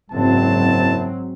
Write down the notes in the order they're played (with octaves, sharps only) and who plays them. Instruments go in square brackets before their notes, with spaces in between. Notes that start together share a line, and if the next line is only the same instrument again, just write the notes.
[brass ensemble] F#1 E4 A5 [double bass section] G#2 F#3 C4